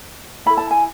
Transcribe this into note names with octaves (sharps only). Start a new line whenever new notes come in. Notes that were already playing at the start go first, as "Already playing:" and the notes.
E4 A4 B5
A5
G#5